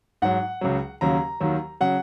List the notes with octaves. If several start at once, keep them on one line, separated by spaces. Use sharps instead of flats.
G#2 F#3 F#5
C#2 C#3 F#3
D#2 C#3 F#3 A#5
D#2 D#3 F#3
C#3 F#3 F#5